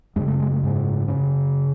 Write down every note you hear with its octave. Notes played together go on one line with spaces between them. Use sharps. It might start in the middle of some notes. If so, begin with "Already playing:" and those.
F#2 C#3 G#3
A3
G#3
A3
G#2 G#3
C#3 C#4